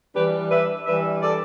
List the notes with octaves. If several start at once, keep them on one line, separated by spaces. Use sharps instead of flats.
E3 G3 D4 G4 B4
B4 E5
E3 G3 D4 B4 E5
A4 D5